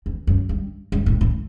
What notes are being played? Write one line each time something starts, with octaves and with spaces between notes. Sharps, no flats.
E2
F#2
G2
G2
A2
A2